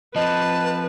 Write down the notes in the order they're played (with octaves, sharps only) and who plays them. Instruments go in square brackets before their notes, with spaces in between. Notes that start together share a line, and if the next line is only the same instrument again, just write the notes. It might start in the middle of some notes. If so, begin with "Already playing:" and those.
[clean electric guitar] F3 C4 [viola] B4 [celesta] D#5 [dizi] A5